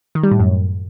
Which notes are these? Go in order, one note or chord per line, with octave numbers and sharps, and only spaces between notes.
D#3
G3
A2
F#2